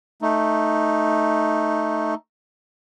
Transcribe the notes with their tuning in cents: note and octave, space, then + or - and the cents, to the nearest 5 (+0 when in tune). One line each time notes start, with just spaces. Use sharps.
A3 +0 D#4 +0